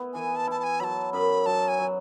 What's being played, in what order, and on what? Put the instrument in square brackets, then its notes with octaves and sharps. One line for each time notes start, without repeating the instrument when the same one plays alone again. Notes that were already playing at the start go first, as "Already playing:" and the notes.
Already playing: [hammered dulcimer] B3 E4
[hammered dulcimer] E3 [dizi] G#5
[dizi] A5
[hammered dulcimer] E4 [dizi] A5
[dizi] A5
G#5
[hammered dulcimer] F#3 [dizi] B5
[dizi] A5
[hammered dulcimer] F#2 [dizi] B5
[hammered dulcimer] F#3 [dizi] A5
[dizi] G#5
[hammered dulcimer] F#3